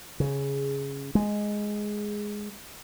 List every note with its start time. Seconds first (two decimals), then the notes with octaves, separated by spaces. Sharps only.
0.20 C#3
1.15 G#3